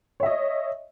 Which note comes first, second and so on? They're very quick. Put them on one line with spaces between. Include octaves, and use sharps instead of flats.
C#5 E5 D#5